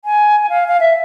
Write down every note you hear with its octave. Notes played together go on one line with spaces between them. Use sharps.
G#5
G#5
F5
F5
E5